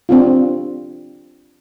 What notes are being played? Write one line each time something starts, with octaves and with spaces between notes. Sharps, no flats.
C4 D4 F4